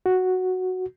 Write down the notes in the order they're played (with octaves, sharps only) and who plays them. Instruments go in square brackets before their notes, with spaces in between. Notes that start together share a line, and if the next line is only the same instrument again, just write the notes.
[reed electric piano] F#4